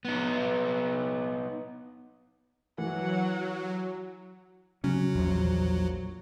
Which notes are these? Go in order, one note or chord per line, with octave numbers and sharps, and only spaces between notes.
B3 D#4
E3 F#3 F#5
C#3 F#3 C#4
A#1 E2 A#2 F3